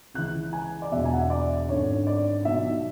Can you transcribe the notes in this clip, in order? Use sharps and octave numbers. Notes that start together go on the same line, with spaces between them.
C#2 C#3 E3 F#6
G#5
D5
E1 E2 B2 E5
G#5
F#5
E5
D5
G#1 F#2 D3 C#5
D5
B1 B2 E5